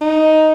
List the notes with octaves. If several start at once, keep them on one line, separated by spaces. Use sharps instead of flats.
D#4